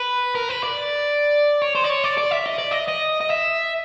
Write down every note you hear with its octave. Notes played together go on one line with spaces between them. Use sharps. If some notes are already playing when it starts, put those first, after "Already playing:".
Already playing: B4
A#4
B4
D5
C#5
C5
D5
C#5
D5
D5
E5
D#5
D5
D#5
D#5
D#5
E5